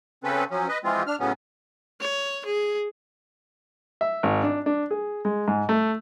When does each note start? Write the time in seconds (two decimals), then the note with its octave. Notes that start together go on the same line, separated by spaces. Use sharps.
0.24 C#3 C4 C#4 A4 B4
0.51 F3 F#3 C#4
0.69 B4 D#5
0.84 E3 F3 G#3 C4 F4
1.07 D4 F6
1.20 A2 C#3 F#3 B3 C#4
2.00 C#5
2.45 G#4
4.01 E5
4.23 G#1
4.43 D4
4.66 D4
4.91 G#4
5.25 G#3
5.48 G#2
5.69 A3